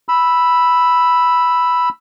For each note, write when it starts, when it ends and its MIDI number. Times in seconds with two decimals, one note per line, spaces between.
0.09 1.89 83
0.09 1.89 88